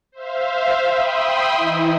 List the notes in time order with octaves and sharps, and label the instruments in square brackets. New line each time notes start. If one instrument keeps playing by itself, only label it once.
[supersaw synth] C5 E5 F5
E5 G5 B5 C6 D#6
E3 D#4 E4